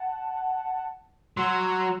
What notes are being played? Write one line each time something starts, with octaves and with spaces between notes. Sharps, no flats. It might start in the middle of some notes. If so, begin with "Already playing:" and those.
Already playing: F#5 A5
F#3 C6 E6